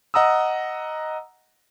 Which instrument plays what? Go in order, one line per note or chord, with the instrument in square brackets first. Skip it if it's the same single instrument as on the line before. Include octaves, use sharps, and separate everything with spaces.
[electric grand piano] D#5 F#5 A#5 D#6 E6